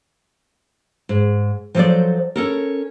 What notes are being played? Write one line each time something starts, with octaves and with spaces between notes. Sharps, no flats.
G#2
F3 F#3 A4 B4 C5 D5
C#4 A4 A#4